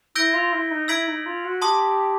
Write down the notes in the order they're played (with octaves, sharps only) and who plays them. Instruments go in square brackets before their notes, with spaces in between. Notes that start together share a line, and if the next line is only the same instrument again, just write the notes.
[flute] E4 [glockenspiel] E6 G6 A#6 D7 G7
[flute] F4
E4
D#4
[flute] E4 [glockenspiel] E6 G#6 B6 D7 F#7
[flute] D#4
F4
F#4
[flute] G4 [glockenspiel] A5 C6 D#6